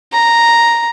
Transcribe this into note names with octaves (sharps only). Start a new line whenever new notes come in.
A#5